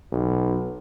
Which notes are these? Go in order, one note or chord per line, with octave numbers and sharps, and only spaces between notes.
B1